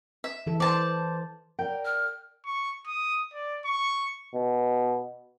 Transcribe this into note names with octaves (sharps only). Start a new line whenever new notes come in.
E5
E3 A4
C5 D5 A5
A#4 D5 G5
F6
C#6
D#6
D5
C#6
B2